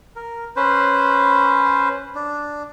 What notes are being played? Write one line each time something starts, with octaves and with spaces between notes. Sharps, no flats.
A#4
C#4 B4 C5
D4